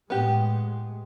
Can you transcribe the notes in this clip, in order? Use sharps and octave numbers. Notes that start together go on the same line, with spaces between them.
A2 G#3 B3 G4